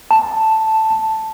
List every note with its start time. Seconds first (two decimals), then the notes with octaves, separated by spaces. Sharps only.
0.11 A5